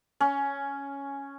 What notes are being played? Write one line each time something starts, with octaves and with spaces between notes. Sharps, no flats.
C#4